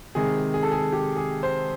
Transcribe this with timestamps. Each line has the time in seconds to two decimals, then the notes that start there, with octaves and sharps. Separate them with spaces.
0.15 C3 D#3 G#3 G#4
0.54 G#4
0.63 A4
0.72 G#4
0.92 G4
1.17 G#4
1.43 C5